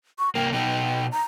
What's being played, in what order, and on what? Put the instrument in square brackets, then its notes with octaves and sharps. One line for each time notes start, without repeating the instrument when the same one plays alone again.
[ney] C#6
[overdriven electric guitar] C2 A#3 [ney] G5
[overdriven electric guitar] B2 D#4 [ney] G5
[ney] A#5